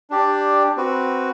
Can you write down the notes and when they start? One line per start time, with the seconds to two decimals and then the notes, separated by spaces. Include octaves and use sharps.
0.10 D4 G4 D5
0.77 C4 F#4 B4